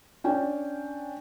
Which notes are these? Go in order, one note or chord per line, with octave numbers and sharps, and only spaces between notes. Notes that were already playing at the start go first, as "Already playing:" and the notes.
C#4 D4 G5